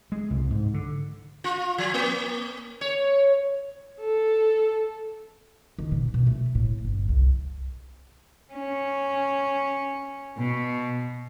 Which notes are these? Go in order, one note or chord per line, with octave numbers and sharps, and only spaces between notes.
G#3
C2
G#2
D3
F4
F3
A#3
C#5
A4
D#3
B2
B2
A3
A2
G1
C2
C#4
B2